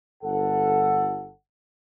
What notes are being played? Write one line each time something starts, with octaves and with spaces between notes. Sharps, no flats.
G1 A4 F#5